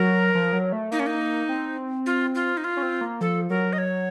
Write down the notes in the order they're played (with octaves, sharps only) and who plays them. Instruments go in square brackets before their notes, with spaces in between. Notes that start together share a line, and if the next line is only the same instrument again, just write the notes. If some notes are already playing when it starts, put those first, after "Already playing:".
Already playing: [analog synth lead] F#3 [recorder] A#4
[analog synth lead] F3
F#3
A3
[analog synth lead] A#3 [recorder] D#4
[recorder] C#4
D#4
[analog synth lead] C4
[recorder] F4
F4
D#4
F4
[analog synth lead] C#4
C4
A#3
[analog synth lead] F3 [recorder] A4
[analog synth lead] F#3 [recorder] A#4
[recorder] D#5
C#5